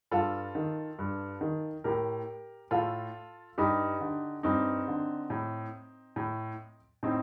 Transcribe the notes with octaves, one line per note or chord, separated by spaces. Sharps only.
G2 F4 A4
D#3
G2
D#3
A2 G4 A#4
A2 F4 A4
G2 D#4 G4
D3
G2 C4 D#4
D3
A2
A2
A2 C4 D#4